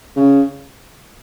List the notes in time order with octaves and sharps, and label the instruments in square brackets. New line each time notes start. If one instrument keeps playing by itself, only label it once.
[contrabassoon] C#3